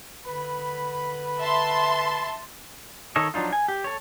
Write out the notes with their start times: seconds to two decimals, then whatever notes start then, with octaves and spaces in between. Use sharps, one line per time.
0.25 D3 B4 B5
1.39 E5 A5 C6
3.16 D#3 A4 C#5 D#5
3.34 F3 F#3 D4 D#4 F4
3.53 G#5
3.68 G4
3.84 A4 C#5